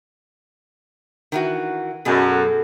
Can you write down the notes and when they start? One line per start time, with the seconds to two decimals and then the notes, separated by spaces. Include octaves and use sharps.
1.32 D#3 E3 F#4
2.05 F#2 B2 G#4 A4